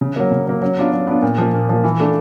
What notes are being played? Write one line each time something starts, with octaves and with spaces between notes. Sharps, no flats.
C#3
F#3 A#3
C#3
F#3 A#3
F#3
B3 D4 F4
F#3
B3 D4 F4
A#2
F3 A#3
A#2
F3 A#3
E3
A3 D4 F4